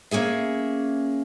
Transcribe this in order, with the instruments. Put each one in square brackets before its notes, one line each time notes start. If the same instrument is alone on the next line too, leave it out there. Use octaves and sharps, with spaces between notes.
[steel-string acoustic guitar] A#3 C#4 G#4 E5